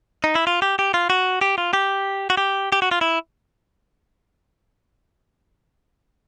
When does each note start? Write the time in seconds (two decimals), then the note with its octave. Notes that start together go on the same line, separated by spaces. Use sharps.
0.24 D#4
0.35 E4
0.47 F4
0.62 G4
0.79 G4
0.94 F4
1.10 F#4
1.41 G4
1.58 F4
1.73 G4
2.30 F#4
2.37 G4
2.72 G4
2.82 F#4
2.91 F4
3.01 E4